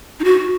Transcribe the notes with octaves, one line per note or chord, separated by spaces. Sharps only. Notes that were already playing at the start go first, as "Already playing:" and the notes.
D#4
F#4